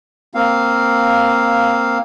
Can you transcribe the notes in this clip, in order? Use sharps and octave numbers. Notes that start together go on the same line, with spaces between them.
A#3 C4 F5